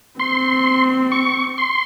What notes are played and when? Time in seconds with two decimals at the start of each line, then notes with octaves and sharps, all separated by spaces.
0.19 C4 C6
1.12 C#6
1.58 C6